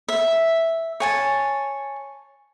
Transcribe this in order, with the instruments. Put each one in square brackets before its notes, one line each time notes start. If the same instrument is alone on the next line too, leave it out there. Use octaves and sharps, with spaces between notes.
[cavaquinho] E5
C#5 G#5 A5